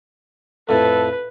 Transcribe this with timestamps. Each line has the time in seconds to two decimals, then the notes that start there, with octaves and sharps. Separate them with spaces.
0.69 F2 A2 A4 B4